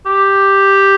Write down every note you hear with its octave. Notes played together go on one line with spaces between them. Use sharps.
G4